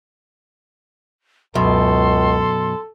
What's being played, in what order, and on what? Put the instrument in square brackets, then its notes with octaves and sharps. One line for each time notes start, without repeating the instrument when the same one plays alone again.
[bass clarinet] C#2 [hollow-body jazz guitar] F#2 B2 [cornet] A4 [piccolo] C6